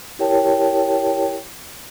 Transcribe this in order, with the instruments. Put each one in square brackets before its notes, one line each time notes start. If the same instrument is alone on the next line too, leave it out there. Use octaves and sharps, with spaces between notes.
[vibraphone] E4 G4 A#4 C#5 G5 A5